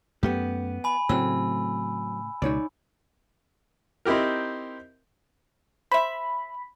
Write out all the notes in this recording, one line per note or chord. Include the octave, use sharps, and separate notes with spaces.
F#2 A3 B3 G4
G#5 B5
A2 C#3 F#3 A3 C4 E6
C#2 B2 D#4 C#5 D5
C4 D#4 E4 G4 A#4
C5 E5 B5